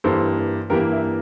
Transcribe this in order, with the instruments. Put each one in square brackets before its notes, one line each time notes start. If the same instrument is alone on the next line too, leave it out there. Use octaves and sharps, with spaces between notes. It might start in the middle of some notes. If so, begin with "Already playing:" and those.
[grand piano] G2 E3 A#3 A4 C5
G2 E3 A#3 G4 A#4
E4